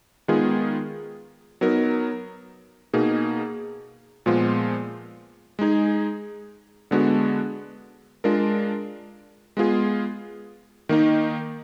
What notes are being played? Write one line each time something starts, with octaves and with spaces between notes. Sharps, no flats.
D#3 G#3 B3 F4 G#4
F#3 B3 D#4 A#4
B2 A#3 D#4 G#4
A#2 F3 G#3 B3 F4
G#3 D#4 G#4
D3 G#3 B3 D4 F#4
G#3 D4 F4 A#4
G#3 B3 F4 G#4
D#3 A#3 D#4